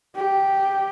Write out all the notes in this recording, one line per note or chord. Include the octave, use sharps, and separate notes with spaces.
G4